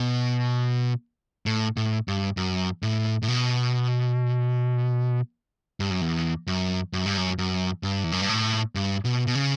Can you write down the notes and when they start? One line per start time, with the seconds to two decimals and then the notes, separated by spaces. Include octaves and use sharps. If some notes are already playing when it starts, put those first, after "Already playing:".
Already playing: B2
1.46 A2
1.77 A2
2.08 G2
2.37 F#2
2.83 A2
3.23 A2
3.28 B2
5.80 G2
5.91 F#2
6.01 E2
6.47 F#2
6.93 F#2
7.06 G2
7.17 F#2
7.38 F#2
7.83 G2
8.04 E2
8.12 F#2
8.21 G2
8.29 A2
8.75 G2
9.05 B2
9.27 B2
9.35 C#3